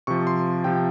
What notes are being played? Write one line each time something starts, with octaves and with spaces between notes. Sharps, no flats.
C3 F3 C#6
C6
C3 F3 G5